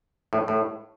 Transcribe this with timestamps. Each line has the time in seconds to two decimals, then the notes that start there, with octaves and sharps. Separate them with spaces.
0.33 A2
0.48 A2